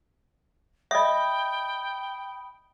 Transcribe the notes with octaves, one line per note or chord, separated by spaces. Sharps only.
D#5 E5 G5 B5 D#6